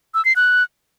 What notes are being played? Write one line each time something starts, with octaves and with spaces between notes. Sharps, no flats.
E6
C7
F#6